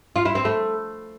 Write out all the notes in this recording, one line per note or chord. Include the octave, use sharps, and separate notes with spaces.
F4
E4
C4
A3